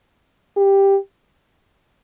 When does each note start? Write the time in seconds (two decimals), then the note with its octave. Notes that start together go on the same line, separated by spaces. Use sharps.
0.57 G4